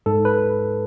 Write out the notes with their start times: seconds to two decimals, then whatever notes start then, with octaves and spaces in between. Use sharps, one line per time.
0.06 G#2 A4
0.25 B4